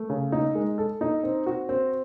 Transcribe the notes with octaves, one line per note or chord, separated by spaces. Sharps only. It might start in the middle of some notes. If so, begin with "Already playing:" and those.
Already playing: A3
C#3
D#4
G#3
A4
D#4
C4
F#4
C4